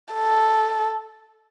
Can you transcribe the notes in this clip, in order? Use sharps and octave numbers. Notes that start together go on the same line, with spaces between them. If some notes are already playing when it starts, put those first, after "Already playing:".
A4